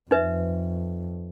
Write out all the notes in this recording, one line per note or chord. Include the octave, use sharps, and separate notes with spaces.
F2 D#4 B4 E5